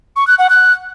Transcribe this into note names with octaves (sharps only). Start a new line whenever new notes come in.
C#6
F#6
F#5
F#6